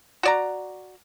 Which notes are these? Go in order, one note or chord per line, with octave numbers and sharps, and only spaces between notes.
F#4 D5 A#5